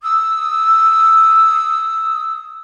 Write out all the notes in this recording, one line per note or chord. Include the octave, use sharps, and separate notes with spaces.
D#6 E6